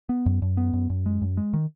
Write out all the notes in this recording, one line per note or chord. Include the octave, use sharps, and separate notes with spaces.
B3
F#2
F#2
B3
F#2
F#2
G#3
F#2
G#3
D#3